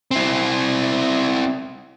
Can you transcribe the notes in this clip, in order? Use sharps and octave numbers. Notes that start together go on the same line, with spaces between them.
C4 E4